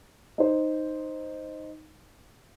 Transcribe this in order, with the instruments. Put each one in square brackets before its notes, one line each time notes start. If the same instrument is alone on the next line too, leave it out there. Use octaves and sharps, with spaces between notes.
[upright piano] D#4 C5